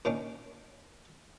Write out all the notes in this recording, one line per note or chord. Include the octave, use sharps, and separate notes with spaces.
A#2 D#3 C#4 D4